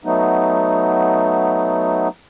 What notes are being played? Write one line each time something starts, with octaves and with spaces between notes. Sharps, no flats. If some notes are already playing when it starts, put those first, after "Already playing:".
F#3 A3 B3 D#4